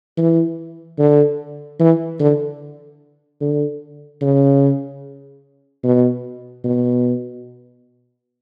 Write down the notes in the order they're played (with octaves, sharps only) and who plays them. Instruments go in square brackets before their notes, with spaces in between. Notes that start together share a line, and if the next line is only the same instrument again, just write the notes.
[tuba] E3
D3
E3
D3
D3
C#3
B2
B2